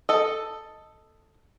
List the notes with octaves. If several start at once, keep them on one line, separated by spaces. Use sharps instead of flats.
A4 D#5